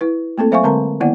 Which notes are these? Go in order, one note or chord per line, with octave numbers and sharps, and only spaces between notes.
E4 B4
A3 A#3 C4 A4
F#3 C5 E5 F5 G#5 C#6
D3 G#3 C4 A#4 A5 A#5
D#3 A#3 B3 E4 D5 F#5